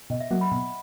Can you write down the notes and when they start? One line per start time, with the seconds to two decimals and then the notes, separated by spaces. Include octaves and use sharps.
0.10 B2 D#5
0.20 E5
0.31 F#3 A#3 F#5
0.41 B5
0.52 B2